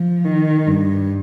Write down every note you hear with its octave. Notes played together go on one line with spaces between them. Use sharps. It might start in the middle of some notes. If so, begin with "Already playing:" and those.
Already playing: F3
D#3
G2